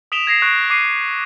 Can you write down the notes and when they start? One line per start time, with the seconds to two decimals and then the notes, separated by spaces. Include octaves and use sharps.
0.12 D#6 B6 D7 E7 F7 G7
0.27 G#6 A#6 C7 E7
0.42 C#6 F#6 D7
0.70 D6 C7 D#7